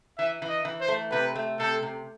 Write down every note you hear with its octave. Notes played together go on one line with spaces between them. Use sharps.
E3 E5
E3
D#5
E3
C5
A3
C3 B4
A3
C3 A4
C3